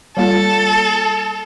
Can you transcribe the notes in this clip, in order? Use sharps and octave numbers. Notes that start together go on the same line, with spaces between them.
G3 A#3 F4 A4